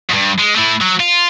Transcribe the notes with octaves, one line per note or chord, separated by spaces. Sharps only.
E2 G2
G#3
A3 E4
F#3
F4